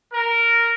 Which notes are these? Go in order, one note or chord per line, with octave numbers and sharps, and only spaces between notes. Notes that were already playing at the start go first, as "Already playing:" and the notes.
A#4